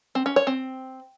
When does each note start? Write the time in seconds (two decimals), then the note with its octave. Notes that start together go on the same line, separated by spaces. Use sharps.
0.15 C4
0.26 C#4
0.36 C#5
0.47 C4